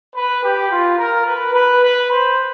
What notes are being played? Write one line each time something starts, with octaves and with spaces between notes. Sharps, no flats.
B4
G4
F4
A#4
B4
B4
B4
C5